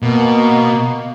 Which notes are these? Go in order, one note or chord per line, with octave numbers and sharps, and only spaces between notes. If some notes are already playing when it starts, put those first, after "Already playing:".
B2 A#3